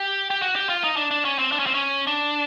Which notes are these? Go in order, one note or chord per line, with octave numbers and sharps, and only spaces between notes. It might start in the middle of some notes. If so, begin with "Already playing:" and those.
Already playing: G4
G4
F#4
G4
F4
D#4
D4
D4
C#4
C4
D4
C#4
C4
C#4
D4